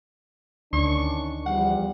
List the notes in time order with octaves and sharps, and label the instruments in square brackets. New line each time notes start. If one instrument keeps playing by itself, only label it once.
[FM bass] D2 [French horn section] D#3 C#4 D4 [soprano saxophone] C#6
[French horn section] E2 F3 G3 [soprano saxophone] F#5